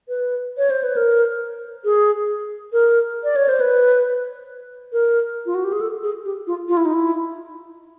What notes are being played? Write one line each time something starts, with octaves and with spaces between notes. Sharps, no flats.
B4
C#5
C5
B4
A#4
G#4
A#4
D5
C#5
C5
B4
A#4
F4
F#4
G4
G#4
A4
G#4
G4
F4
F4
E4
D#4
E4